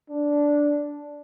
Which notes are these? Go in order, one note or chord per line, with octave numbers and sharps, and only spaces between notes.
D4